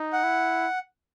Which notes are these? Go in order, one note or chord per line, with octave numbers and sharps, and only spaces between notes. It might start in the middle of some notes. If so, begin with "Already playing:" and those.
Already playing: D#4
F#5
E4